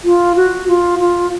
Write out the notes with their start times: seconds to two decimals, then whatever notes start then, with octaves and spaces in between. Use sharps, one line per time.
0.04 F4
0.36 F#4
0.68 F4
0.99 F4